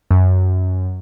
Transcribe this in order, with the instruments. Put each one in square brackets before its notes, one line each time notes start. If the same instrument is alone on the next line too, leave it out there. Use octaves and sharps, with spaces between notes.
[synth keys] F#2